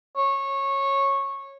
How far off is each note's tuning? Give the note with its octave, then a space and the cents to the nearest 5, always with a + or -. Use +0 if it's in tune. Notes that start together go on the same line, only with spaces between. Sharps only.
C#5 -15